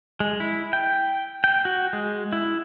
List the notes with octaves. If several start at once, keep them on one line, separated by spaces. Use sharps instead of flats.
G#3
E4
G5
G5
F#4
G#3
E4